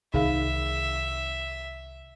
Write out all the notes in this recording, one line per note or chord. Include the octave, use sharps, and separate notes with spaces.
C2 D#3 D#4 G#4 E5 F5